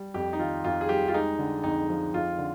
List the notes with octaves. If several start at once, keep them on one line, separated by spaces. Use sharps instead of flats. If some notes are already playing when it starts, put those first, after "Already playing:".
Already playing: G3
F2 G4
D#4
D#3 F4
F2 F4
G#4
G3 G4
F4
G#3 D#4
D3
F2 D#4
F3
F2 F4
D3